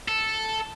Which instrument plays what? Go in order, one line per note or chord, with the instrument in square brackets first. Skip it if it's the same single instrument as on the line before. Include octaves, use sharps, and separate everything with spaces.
[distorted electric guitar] A4